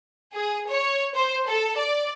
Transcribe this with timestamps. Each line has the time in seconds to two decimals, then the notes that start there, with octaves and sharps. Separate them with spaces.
0.34 G#4
0.69 C#5
1.15 C5
1.47 A4
1.77 D5